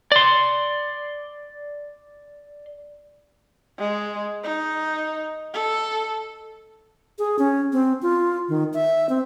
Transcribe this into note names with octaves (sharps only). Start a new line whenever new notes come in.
D5 C6
G#3
D#4
A4
G#4
C#4
C4
F4
D#3
E5
C4